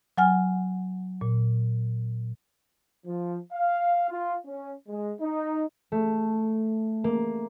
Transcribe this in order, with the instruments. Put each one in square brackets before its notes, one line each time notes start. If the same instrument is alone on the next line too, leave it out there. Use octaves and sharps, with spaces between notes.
[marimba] F#3 F#5 G#5 F6
A#2
[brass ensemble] F3
F5
F4
C#4
G#3
D#4
[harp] A3
A#3